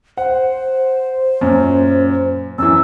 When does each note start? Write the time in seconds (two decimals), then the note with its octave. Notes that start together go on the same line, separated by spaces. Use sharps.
0.17 C5 F#5
1.41 F#2 A#2
2.58 F#2 E3 E6